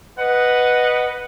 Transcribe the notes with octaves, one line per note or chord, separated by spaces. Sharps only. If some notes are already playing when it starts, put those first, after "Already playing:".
B4 D#5 F#5